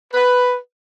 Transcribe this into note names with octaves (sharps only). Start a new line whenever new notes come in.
B4